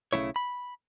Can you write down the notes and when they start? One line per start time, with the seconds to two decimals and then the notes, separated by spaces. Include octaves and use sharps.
0.13 B1 C#3 G#3 A3 E4 C#5
0.36 B5